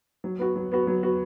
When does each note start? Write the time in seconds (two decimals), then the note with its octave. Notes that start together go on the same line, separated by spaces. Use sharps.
0.24 F#3
0.39 B3 F#4
0.56 F#3
0.72 B3 F#4
0.87 F#3
1.03 B3 F#4